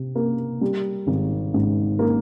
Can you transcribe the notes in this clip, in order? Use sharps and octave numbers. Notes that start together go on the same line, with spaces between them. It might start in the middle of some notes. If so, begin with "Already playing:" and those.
Already playing: C3
A#3
G3
G#1
G#2
A#3